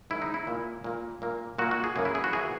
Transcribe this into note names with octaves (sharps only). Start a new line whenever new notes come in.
G#2 D#3 G#3 E4
D#4
E4
A#2 A#3
A#2 A#3
A#2 A#3
A#2 A#3 F#4
F#4
G#4
F#2 E3 A#3 G#4
E4
G#4
F#4
E3 A#3 G#4